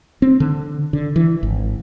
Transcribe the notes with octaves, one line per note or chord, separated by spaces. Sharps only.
C4
D3
D3
E3
G#1